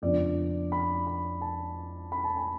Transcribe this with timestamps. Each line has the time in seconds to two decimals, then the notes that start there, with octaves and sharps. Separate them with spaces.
0.02 F2 C#3 F3 B3 D4 D5
0.72 B5
1.07 B5
1.41 A5
2.12 B5
2.24 A5
2.36 G#5